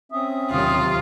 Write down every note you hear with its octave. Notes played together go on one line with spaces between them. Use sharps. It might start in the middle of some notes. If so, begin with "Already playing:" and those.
C4 C#4 E5 D#6
D#2 C3 F#3 F4